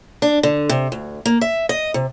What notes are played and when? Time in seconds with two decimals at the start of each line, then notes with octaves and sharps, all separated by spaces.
0.22 D4
0.43 D3
0.69 C3
0.92 D2
1.26 A#3
1.41 E5
1.69 D#5
1.94 C3